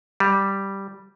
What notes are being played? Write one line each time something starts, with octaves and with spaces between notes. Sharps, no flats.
G3